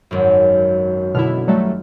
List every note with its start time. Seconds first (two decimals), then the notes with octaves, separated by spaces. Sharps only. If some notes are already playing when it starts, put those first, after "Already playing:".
0.11 G#1 F#2
1.15 B2 D3 E4 F6
1.48 F#3 G3 A3